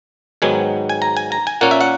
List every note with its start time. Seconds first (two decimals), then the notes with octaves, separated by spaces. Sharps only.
0.42 G#2 D#3 F#3 B3 G#5
0.89 G#5
1.02 A#5
1.17 G#5
1.32 A#5
1.47 G#5
1.61 A#2 A#3 C#4 F#5
1.71 E5
1.81 F#5